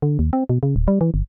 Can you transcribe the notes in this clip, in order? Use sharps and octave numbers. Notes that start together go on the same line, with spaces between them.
D3
D#2
C4
B2
C#3
D1
G3
E3
G1